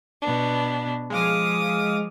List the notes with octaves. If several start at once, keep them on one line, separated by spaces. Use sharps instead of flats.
B2 B3 D4
F3 G#3 F5 D6 D#6 F6